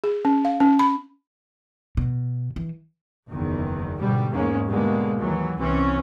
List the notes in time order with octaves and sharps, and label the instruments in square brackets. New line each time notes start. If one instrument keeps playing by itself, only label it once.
[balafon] G#4
C#4
F5
C#4
B5
[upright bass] B2
E3
[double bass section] F#1 E2 D#3
G#2 B2 D3 G3
E2 G#2 G#3 A#3 C#4
B2 D3 G3 G#3 A#3
D#2 E3 F#3
C2 E3 C4 C#4